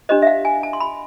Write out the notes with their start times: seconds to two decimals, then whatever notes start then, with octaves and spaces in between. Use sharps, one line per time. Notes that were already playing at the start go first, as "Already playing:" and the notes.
0.09 D4 G4 C5 D#5
0.22 E5
0.27 F5
0.45 G#5
0.63 A5
0.73 C6
0.80 B5